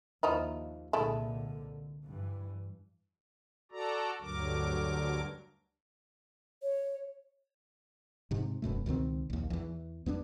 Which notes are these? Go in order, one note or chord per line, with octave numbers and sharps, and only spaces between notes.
D#2 F3 D#4 E4
C2 A#2 D3 G#3 A3 E4
G2 E3
F#4 A4 D5 A#5
D2 G2 D3 F#3 A#4 D6
C#5
G#2 C3
E1 F#2 B2 A3
C#2 B2 D#3 C4
A#1 D#2
E2 E3
E2 B3 C#4 D4